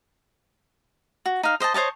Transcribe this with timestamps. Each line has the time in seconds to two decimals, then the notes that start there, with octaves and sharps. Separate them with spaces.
1.26 F#4
1.43 D#4 F5
1.60 C5 D#5 G5 A5
1.74 C5 C#5 D#5 A5